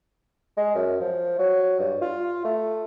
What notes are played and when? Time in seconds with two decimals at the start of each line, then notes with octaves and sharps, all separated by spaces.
0.57 G#3
0.75 F#2
1.00 F3
1.39 F#3
1.79 G2
2.02 F4
2.45 A3